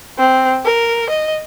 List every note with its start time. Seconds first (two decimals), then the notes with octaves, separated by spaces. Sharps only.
0.18 C4
0.65 A#4
1.09 D#5